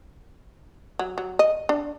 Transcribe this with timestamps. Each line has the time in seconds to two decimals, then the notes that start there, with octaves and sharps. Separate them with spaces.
0.99 F#3
1.18 F#3
1.39 D#5
1.69 D4